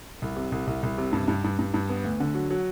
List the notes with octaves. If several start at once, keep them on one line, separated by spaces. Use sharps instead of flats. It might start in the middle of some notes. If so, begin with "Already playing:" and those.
C2
C3
C2
C2
C2
C3
G2
G2
G2
G2
G2
B3
D2
D3
F#3
F#3